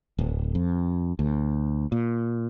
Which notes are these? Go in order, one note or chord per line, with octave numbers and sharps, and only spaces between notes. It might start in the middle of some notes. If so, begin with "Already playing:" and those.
D1
F2
D2
A#2